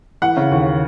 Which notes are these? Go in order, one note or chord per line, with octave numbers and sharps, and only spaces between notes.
E3 F#5
C#3
D#2